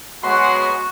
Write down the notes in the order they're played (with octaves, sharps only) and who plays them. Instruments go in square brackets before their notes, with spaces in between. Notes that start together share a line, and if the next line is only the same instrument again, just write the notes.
[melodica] F#3 B3 B5 [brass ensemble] G#3 F#5 [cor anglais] F#4 [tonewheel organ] C6